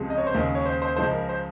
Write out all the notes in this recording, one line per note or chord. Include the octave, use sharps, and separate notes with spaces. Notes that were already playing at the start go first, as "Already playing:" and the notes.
Already playing: C#2 C3 F3 G#3
D#5
C#5
C5
D#2 C#3 G#3 A#4
C#5
C5
C5
C#2 C#3 F3 G#3 C5
A#4
C5